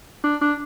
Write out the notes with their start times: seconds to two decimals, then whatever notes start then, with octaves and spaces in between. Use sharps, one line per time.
0.24 D4
0.41 D4